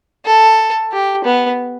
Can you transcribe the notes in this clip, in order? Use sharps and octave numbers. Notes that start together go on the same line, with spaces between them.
A4
G4
B3